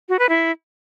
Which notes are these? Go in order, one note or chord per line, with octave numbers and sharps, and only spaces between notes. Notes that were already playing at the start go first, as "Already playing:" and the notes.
F#4
B4
E4